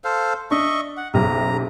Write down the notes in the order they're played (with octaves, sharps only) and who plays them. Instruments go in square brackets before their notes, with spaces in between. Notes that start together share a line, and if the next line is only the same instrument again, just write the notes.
[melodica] A4 C5 F5
[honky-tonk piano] D4 [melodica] D#5 E5 C#6
[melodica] F#5
[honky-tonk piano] F#1 B1 G4 [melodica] A#5